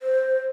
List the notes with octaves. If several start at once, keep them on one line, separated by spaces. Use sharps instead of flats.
C5